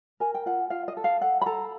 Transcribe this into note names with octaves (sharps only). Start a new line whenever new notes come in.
A#4 G#5
G5
F4 F#5
F4 F5
D#5
A4
F5
A4 F#5
B5
A4 A#5